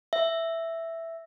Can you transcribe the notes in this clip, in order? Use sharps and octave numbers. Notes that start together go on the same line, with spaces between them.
E5